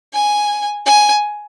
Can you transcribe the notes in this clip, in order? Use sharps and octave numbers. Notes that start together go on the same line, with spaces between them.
G#5
G#5